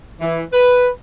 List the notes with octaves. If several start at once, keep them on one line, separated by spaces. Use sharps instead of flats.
E3
B4